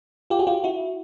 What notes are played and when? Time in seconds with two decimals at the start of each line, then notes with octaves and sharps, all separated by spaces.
0.30 F4 G4
0.39 F#4 G#4
0.47 F4 G4
0.64 E4 F#4